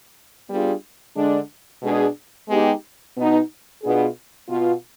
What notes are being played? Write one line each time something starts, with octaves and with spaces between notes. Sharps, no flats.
G3 B3 D4 F4 G#4
D3 G#3 D4
B2 G#3 D4 G#4
G#3 B3 D#4 G4
B2 B3 D#4
B2 B3 D4 F4 G#4
B2 B3 F4